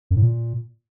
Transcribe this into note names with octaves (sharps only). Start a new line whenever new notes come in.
F#2
A2
A#2